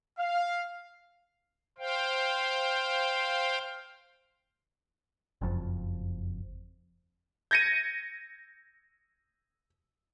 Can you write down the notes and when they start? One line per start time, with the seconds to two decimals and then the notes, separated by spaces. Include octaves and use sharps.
0.19 F5
1.78 C5 F5 G5
5.41 F#1 F2
7.51 G6 G#6 A#6 C#7 D#7